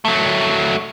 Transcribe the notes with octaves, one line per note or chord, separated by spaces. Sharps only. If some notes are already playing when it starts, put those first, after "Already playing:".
F#3 A3